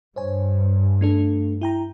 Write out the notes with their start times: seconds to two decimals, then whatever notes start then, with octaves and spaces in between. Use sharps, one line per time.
0.16 G2 C5 C#5 G#5
1.01 A3 D4 A4
1.61 E4 G5 A#5